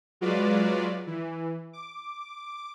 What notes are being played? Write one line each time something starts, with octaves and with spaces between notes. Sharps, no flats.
F#3 G#3 F4 F#4 B4 D5
E3
D6